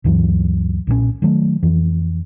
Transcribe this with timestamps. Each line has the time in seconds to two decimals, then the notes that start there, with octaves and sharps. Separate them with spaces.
0.04 D2 G2 E3 F#3
0.87 B1 A#2 F3 C#4
1.22 D#3 F#3 G3 A3
1.63 F2 E3